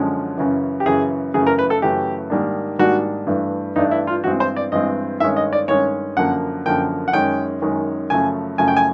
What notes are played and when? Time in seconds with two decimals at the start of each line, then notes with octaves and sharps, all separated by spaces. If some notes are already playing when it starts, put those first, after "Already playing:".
Already playing: F#2 D3 F3 G#3 C#4
0.38 F#2 C#3 E3
0.80 G4
0.86 F#2 C#3 E3 G#4
1.34 F#2 C#3 E3 A3 G#4
1.47 A#4
1.59 B4
1.70 A4
1.82 F#2 C#3 E3 A3 G4
2.30 G#2 D#3 G3 A#3 D4
2.79 G#2 D#3 G3 A#3 D4 F#4
3.27 G2 E3 A3 D4
3.76 G2 E3 A3 D4 D#4
3.91 E4
4.07 F4
4.24 G2 E3 G#3 C4 F#4
4.40 C5
4.56 D5
4.72 G2 E3 G#3 C4 D#5
5.20 G2 D#3 G#3 C#4 E5
5.36 D#5
5.53 D5
5.68 G2 D#3 G#3 C#4 C#5
6.17 F#2 D3 F3 A#3 F#5
6.65 F#2 D3 F3 A#3 G5
7.08 F#5
7.13 F#2 D#3 G#3 C#4 G5
7.62 F#2 D#3 G#3 C#4
8.10 F#2 C#3 F3 A3 G#5
8.58 F#2 C#3 F3 A3 G#5
8.68 G5
8.77 G#5